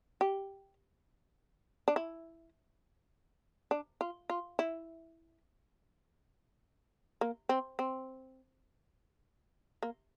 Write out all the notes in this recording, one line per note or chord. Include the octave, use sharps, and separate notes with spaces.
G4
D4
E4
D4
F4
F4
E4
A#3
C4
C4
A#3